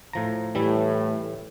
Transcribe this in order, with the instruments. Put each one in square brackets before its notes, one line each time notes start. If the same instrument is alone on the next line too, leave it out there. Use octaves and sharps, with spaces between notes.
[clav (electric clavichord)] A2 F3 A#5
[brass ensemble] A2 [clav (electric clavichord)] E3 G3 E4